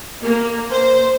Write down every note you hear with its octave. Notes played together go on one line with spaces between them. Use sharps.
A#3
C5